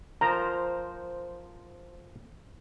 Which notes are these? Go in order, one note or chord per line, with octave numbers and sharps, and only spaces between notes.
F3 A#4 C5 A#5